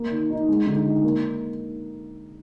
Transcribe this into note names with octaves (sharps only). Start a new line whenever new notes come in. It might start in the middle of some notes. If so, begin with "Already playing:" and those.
Already playing: A#3
D#3
D#4
G#3
D3
D#4
A#3